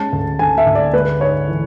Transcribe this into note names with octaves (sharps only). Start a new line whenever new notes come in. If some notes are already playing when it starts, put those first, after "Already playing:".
Already playing: G#3 C#4 A5
D2
D3 G#5
E5
D2
D5
G#3 B4
G#2 C#5
E3